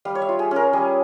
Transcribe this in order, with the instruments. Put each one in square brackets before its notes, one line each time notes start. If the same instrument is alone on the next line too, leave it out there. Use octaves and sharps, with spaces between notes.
[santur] G3 F5
C#5
E5
F4
G#4
C#4 A#4
G3 G#4